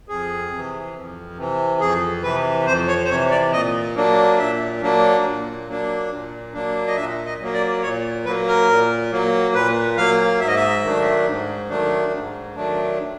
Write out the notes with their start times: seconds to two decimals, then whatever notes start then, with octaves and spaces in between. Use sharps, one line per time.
0.08 F2 G#4
0.51 C3 E3
0.95 F2
1.38 C3 E3
1.80 F2 G#4
2.23 C3 E3 B4
2.67 F2 C5
2.88 C#5
3.05 C5
3.09 C3 C#5
3.13 E3
3.31 D5
3.52 A#2 D#5
3.96 F#3 A#3 D4
4.38 A#2 E5
4.82 F#3 A#3 D4
5.24 A#2
5.67 F#3 A#3 D4
6.10 A#2
6.53 F#3 A#3 D4
6.87 D#5
6.96 A#2 E5
7.25 D#5
7.40 F#3 A#3
7.54 D5
7.82 A#2 C#5
8.25 F#3 A#3 B4
8.47 A#4
8.68 A#2
9.11 F#3 A#3
9.54 A#2 B4
9.97 F#3 A#3 F5
10.40 G#2 E5
10.48 D#5
10.56 E5
10.83 D#3 F#3 A3 D4
11.26 G#2
11.69 D#3 F#3 A3 D4
12.12 G#2
12.55 D#3 F#3 A3 D4